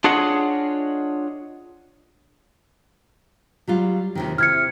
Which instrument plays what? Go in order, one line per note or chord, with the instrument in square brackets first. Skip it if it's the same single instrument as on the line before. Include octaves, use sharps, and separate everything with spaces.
[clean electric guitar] D4 F4 G#4 C#5 D#5 F#5
[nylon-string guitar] F#3 G3 F4
D#2 C3 D#3
[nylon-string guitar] C3 E4 [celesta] F6 G#6 C#7